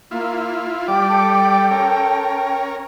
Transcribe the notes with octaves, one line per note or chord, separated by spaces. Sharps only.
A#3 E4 F4
G3 D5 G5
A4
C#4 A#4